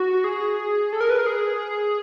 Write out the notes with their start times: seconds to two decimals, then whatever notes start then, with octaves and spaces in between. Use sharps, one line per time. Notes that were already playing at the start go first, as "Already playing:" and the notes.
Already playing: F#4
0.24 G#4
0.93 A4
1.00 A#4
1.10 B4
1.18 A#4
1.26 G#4